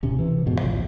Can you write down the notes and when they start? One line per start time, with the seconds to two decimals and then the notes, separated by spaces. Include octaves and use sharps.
0.03 D1 C3 C#4
0.19 C3 E3
0.46 F2 G#2 B2
0.61 A1 D2 F3